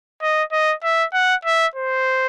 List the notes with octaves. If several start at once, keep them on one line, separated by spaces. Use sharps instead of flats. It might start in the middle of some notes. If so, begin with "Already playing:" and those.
D#5
D#5
E5
F#5
E5
C5